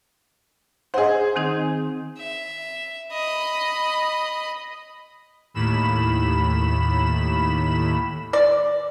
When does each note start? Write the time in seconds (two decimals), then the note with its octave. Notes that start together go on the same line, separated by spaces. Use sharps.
0.94 G#4 C5 D#5 F#5
1.36 D#3 C4 D#4
2.18 E5
3.13 D#5 B5
5.54 D#2 A2 B5 E7
8.33 D5